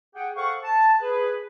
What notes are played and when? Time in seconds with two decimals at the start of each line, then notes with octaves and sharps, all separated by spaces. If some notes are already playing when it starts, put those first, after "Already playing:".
0.15 G#4 F#5 G5
0.35 A4 C5 F5 F#5 C#6
0.63 A5
1.01 G#4 B4